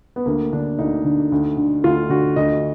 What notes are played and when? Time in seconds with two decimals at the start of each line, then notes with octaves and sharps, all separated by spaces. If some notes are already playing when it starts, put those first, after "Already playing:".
0.16 B3
0.26 D2 A#3
0.53 D3 D4
0.79 D2 D#4
1.05 D3
1.32 D2
1.57 D3
1.84 D2 F4
2.10 D3 F#4
2.36 D2 D#5